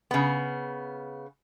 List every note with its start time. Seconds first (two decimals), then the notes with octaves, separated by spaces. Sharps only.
0.11 C#3 B3